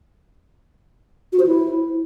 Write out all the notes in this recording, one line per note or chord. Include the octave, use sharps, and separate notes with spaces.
F#4
C5
E4